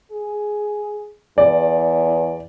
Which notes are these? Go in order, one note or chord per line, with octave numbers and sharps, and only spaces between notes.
G#4
E2 D5